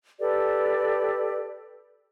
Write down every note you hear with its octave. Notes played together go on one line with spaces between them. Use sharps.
G4 A4 B4 D5